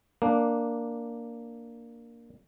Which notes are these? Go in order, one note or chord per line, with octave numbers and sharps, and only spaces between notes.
A#3 D4